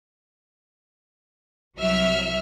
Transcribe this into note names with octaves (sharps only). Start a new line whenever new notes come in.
C2 F#3 E5 F6